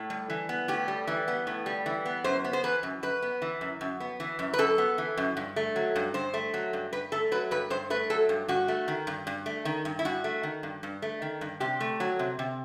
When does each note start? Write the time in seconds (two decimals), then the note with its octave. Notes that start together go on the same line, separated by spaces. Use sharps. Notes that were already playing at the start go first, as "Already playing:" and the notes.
Already playing: A2
0.10 G3
0.30 E3
0.49 B3
0.68 A2 G4
0.88 G3
1.07 E3
1.28 B3
1.47 A2
1.66 G3
1.86 E3
2.06 B3
2.24 F#2 C5
2.44 B3
2.53 C5
2.64 E3 B4
2.83 F#2
3.03 F#2 B4
3.22 B3
3.42 E3
3.61 F#2
3.81 F#2
4.00 B3
4.20 E3
4.39 F#2
4.54 B4
4.59 F#2 A4
4.78 B3
4.98 E3
5.17 F#2
5.37 G2
5.56 A3
5.76 F#3
5.96 G2
6.14 G2 C5
6.34 A3
6.54 F#3
6.73 G2
6.93 G2 B4
7.12 A3 A4
7.32 F#3 B4
7.51 G2 B4
7.70 G2 C5
7.90 A3 B4
8.10 F#3 A4
8.29 G2
8.48 G2 F#4
8.68 A3
8.88 D#3
9.07 G2
9.27 G2
9.46 A3
9.65 D#3
9.85 G2
9.99 E4
10.05 G2 F#4
10.24 A3
10.43 D#3
10.63 G2
10.83 G2
11.02 A3
11.22 D#3
11.41 G2
11.60 C3 G4
11.80 A3
12.00 F#3
12.19 C3
12.39 C3